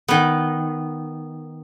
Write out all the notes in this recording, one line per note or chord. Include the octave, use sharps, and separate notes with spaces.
D#3 B3